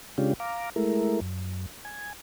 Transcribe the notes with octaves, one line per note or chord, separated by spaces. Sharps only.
C#3 G#3 C#4 D4 F4 G4
F5 A#5 D6
G#3 A3 E4 A#4
F#2
G#5